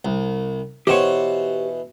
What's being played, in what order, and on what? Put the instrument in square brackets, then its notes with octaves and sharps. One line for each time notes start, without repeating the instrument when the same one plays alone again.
[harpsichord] C2
[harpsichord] B2 E3 [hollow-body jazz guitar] G4 C5 C#5